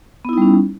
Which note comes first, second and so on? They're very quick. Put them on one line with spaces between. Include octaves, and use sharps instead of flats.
B3 E4 D#4 G3 C#4